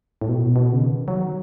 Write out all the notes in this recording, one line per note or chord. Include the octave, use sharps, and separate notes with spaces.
A2
B2
B2
C#3
D#3
F#3